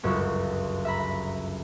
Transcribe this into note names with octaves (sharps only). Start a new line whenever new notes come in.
G1 C#2 F#2 C#3 E6
E5 A#5 B5